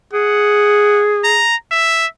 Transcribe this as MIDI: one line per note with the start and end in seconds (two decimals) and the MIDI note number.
0.13 1.44 68
0.13 1.02 78
1.24 1.55 82
1.71 2.07 76